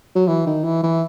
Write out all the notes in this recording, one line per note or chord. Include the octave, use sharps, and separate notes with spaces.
F#3
E3
D#3
E3
E3